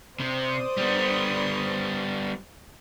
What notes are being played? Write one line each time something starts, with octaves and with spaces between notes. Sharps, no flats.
C3 C5 D5 D#6
G3 B3